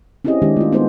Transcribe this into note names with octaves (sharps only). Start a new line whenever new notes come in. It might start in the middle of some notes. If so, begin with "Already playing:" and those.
C4 C#4 E4 G4 G#4 D#5
D#3 G#3 D4 G4
A3 F4
G#3 B3 D#4 F4 G#4 C5